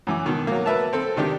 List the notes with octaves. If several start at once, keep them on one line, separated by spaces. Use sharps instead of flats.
F#2 E3 D6
B2 D#3
F#3 A#3
A#4 B4 E5 A5
C4 A4
C3 D#3 D4 G4